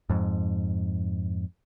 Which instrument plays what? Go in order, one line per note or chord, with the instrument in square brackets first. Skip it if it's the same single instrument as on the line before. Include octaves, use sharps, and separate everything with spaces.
[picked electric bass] F2 G#2